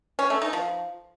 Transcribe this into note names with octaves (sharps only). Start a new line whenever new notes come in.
C#4
A3
D#4
F3